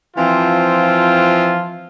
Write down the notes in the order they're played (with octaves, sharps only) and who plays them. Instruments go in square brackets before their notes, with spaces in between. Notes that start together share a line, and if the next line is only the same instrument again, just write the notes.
[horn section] E3 F3 C4 F4